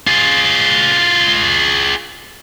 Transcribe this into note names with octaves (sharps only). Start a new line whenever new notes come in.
F4 G#4